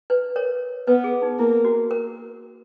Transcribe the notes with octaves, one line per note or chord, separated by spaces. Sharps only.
B4
A#4 C#5
B3 B4
G#4
D#4
A#3 E4
F#4
A#4